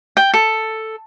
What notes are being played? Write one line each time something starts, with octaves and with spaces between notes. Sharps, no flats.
G5
A4